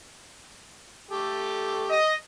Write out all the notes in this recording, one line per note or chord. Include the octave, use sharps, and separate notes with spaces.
A3 G4 A4
D#5